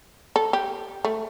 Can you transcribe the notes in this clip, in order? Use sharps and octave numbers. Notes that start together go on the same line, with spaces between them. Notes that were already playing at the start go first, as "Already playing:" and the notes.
A4
G4
A3